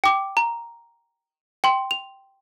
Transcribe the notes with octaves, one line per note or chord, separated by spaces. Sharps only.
G5 D6
A#5
G5 C6
F7